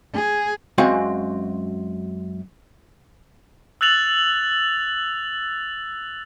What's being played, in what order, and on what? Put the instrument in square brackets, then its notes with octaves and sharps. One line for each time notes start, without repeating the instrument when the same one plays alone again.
[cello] G#4
[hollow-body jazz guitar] F#2 G#3 C4 F#4 F5 G#5
[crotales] E6 F#6 A6 F7 F#7